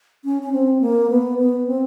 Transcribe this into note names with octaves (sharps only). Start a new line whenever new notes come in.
C#4
C#4
C4
A#3
B3
B3
C4